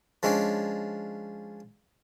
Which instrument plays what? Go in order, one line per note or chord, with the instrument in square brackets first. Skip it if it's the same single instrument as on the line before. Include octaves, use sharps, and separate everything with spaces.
[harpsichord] F3 G#3 C#4 D4 G#5